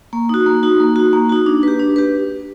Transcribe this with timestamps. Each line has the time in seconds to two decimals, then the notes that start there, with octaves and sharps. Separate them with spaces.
0.13 A#3
0.29 D#4 F#4
0.46 A#3
0.63 D#4 F#4
0.80 A#3
0.96 D#4 F#4
1.13 A#3
1.30 D#4 F#4
1.46 D4
1.63 G4 B4
1.79 D4
1.96 G4 B4